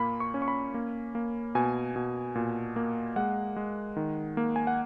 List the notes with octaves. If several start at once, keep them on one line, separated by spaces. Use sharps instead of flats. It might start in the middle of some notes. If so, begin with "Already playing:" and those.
Already playing: A#2 A#3 B5
C#6
C#4
C#6
B5
A#3
A#3
B2 G#5
B2
A#2
A#3
G#3 F#5
G#3
D#3
A#3
G#5
F#5